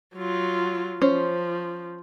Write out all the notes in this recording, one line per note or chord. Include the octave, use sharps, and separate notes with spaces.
F#3 F4
F3 C#4 C5